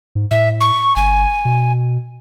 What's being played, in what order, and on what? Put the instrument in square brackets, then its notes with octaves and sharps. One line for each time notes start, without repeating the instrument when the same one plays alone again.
[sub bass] G#2
[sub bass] A2 [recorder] E5
[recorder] C#6
[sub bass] G1 [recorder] G#5
[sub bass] B2